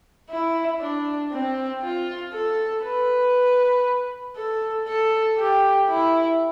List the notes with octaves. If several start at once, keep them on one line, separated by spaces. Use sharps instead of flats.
E4
D4
C4
F4
A4
B4
A4
A4
G4
E4